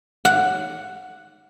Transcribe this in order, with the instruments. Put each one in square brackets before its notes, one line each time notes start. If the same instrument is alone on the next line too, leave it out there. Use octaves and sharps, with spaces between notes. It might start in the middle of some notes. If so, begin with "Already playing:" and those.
[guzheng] F#5